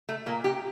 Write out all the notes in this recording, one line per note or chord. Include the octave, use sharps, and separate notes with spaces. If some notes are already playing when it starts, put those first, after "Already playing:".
A3
A#2 A#3
G4